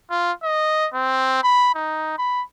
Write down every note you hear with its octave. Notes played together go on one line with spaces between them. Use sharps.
F4
D#5
C4
B5
D#4
B5